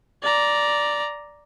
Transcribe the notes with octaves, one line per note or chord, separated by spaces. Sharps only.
D5 A#5